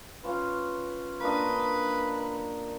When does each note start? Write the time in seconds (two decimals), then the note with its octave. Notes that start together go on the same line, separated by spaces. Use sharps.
0.23 C#4 F4 B4
1.21 A#3 D4 B4 D#5